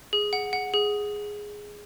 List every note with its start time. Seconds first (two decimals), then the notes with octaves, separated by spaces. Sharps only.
0.13 G#4
0.33 F#5
0.53 F#5
0.74 G#4